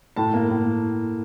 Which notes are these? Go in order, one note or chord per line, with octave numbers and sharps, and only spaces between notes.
A2 A5
A#3
A2